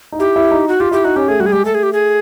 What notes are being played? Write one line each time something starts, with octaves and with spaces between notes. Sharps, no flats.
D#4
E4 G4
E4
D#4
F#4
F4 G4
E4 G4
D#4 F#4
C#4 G4
A3 G#4
G3 F#4
G#4
G#3 G4
A3 A4
G#4
G4
G#4